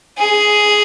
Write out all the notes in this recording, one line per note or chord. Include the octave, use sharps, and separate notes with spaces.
G#4